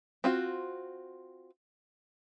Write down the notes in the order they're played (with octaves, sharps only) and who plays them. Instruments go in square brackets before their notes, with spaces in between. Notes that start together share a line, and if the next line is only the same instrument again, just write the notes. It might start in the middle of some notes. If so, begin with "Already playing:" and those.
[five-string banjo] C4 F4 F#4